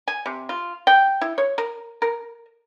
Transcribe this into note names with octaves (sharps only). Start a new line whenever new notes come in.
G#5
C3
F4
G5
E4
C#5
A#4
A#4